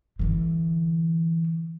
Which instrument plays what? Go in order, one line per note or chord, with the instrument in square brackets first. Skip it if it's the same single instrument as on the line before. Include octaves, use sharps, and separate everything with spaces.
[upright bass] D3 E3